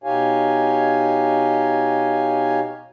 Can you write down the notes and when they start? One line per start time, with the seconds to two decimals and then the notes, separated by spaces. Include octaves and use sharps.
0.04 B2 D#4 G4 C#5 F5 G#5